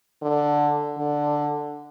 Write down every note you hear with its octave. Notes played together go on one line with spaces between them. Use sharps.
D3
D3